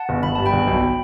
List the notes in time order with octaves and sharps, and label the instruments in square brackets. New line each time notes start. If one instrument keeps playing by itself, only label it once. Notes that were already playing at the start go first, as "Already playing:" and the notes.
Already playing: [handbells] F#5 A5
[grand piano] G1
[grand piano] G1 [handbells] B5
[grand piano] G2 [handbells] A5
[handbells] G5 B5
[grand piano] G1
B1